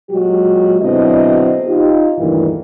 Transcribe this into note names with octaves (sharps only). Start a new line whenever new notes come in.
A#2 F#3 G#3 F#4 G4
B2 D3 F#3 C4 E4 D#5
D#4 F4 G4
D2 G2 A#2 D#3 E3